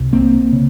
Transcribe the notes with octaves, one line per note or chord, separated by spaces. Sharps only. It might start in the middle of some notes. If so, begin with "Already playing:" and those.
Already playing: C2 C3
A#3 C4
C#3